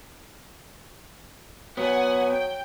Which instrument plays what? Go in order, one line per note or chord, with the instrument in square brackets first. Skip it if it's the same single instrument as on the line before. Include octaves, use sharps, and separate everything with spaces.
[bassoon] F#3 [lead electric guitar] B3 [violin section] F#5 G#5
[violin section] G5